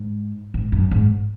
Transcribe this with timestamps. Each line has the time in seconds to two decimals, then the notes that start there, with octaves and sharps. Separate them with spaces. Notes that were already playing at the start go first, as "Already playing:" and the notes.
Already playing: G#2
0.54 G#2
0.72 F#2
0.91 G#2